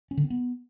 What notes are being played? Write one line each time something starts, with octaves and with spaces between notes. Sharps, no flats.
C#4
D3
C4
B3